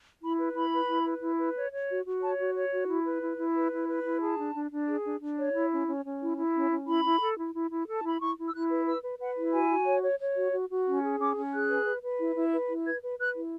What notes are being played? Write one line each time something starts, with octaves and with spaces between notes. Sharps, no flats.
E4 B5
B4
E4 B5
B4
E4
B4
E4
B4
C#5
C#5
F#4
F#4
C#5 A5
F#4
C#5
F#4
E4
B4
E4
E4
B4
E4
B4
E4
G#4 A5
D4
D4
D4
G#4
D4
D4
C#5
E4
C#4
C#4
C#4
E4
E4
C#4
C#4
E4 B5
E4
A4
E4
E4
E4
A4
A5
E4 B5
E4 C#6
E4
E6
E4 F#6
B4
B4 E6
B4
B4 F#5
E4
F#4 G#5
F#4
C#5
C#5
C#5
F#4
F#4
F#4
C#4
G#4
C#4 D6
C#4
G#4 F#6
B4
B4
B4
E4
E4
B4
E4
B4 G#6
B4
B4 F#6
E4